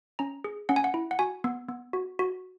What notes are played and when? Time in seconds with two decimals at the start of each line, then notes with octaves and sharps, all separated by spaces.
0.19 C#4 A#5
0.44 G#4
0.69 C#4 F#5
0.76 G#5
0.84 F#5
0.94 E4
1.11 F#5
1.19 F#4 G#5
1.44 B3
1.69 B3
1.93 F#4
2.19 F#4